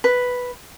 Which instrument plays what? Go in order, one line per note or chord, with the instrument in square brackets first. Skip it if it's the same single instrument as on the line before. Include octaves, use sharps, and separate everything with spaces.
[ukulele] B4